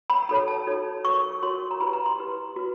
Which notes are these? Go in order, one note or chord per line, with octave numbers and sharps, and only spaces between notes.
B5
D#4 F#4 A4 C#5 B5
A5
D#4 F#4 A4 C#5
F#4 A#4 C#5 C#6
F#4 A#4 C#5 C6
A#5
E4 G4 B4 B5
A#5
C6
E4 G4 B4
F#4 B4